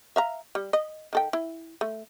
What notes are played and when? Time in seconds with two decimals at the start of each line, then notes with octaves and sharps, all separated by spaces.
0.16 E5 F5 A#5
0.55 G3
0.73 D#5
1.13 D#3 A4 G5
1.33 E4
1.81 A3